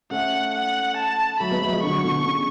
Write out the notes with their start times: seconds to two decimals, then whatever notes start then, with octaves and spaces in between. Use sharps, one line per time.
0.11 A3 C#4 F#5
0.54 F#5
0.97 A5
1.40 F#3 A3 B5
1.51 G#3 B3
1.61 F#3 A3
1.72 F3 G#3
1.83 D3 F#3 C#6
2.04 B2 D3
2.26 C#3